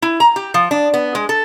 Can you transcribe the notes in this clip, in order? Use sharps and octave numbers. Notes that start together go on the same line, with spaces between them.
E4
A#5
G4
F3
D4
B3
G#3
A4